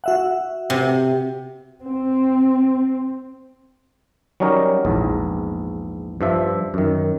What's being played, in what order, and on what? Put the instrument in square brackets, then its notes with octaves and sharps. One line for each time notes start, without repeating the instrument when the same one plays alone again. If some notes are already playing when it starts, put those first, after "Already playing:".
[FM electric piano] F#4 E5 F#5
[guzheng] C3
[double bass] C4
[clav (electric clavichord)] F#3 G3 C#4 D#4 A#4
A#1 E2 G#2
G2 F3 E5
F#2 D#3